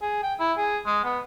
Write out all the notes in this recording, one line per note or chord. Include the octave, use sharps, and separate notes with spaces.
G#4
G5
E4
G#4
G#3
B3